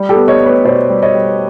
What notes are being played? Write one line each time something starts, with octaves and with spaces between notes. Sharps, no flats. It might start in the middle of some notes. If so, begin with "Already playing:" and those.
Already playing: G3
G4 A4
B3
C#5 D#5
B3
B4 C#5
B2 C5 D5
G3
C#5 D#5
G3